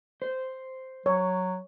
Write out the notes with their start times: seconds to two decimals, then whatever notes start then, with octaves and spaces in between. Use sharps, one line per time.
0.22 C5
1.06 F#3 C#5